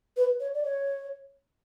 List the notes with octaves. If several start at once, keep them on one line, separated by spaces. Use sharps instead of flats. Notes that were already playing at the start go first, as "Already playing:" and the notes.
B4
C#5
D5
C#5